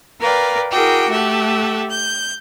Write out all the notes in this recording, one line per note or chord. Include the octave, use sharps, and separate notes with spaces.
A#4 B4 D5 F5 G5
E4 F#4 G#4 A#4 G5 D6
A3 G4 A4 E5 F#5
G6